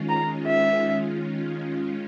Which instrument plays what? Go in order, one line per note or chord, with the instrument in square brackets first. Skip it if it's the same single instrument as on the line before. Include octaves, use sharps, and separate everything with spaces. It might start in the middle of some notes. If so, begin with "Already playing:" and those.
Already playing: [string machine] D#3 G#3 C#4 F4
[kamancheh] A#5
E5